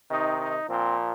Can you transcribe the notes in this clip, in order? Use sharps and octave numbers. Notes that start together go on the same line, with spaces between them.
C3 D#3 D#4
D#4
A#2 F3 C4